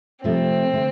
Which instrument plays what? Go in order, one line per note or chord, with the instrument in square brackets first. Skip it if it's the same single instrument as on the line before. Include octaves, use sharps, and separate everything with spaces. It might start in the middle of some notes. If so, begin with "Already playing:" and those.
[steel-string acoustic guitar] C3 F3 A3 [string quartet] C4
[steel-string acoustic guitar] D3 A3